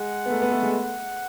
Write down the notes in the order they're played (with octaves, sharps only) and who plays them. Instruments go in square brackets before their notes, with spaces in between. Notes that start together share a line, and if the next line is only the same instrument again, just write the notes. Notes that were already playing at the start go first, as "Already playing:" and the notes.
Already playing: [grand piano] G#3 [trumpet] F#5
[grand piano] B3
A3
B3
A3
G#3
[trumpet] F#5